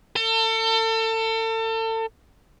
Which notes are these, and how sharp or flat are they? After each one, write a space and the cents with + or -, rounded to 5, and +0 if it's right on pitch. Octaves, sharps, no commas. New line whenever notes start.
A4 +35